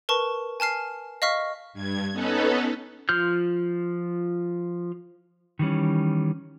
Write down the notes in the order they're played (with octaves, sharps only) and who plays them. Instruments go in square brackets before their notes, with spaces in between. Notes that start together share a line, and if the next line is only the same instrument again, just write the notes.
[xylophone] A#4 B4 A5 C#6
G#5 A5 F6 C7
D#5 F5 C#6 F6 B6
[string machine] G2 G#6
B3 C#4 D#4 A4 B4
[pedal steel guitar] F3 F4 F6 G6
[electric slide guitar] D#3 E3 G3 C#4